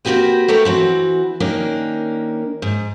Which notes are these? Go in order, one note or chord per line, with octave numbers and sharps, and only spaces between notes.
A#3 C4 C#4 F#4 G4 B4
A3 G4 A#4 B4 C#5
E3 C4 F#4
D#3 A#3 C#4 D4 A#4
G#2